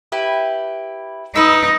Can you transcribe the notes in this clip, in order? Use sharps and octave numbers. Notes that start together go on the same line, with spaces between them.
E4 G4 B4
D#4 B4 D#5 E6